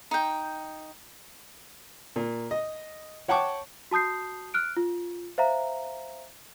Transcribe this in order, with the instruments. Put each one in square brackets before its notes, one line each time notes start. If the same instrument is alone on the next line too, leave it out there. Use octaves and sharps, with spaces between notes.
[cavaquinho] D#4 G5
[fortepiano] A#2
D#5
C#5 F#5 G5 A5 C#6 D6
[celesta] F#4 A5 D#6 G6 C7
F6 F#6 D7
F4
C5 E5 F5 A#5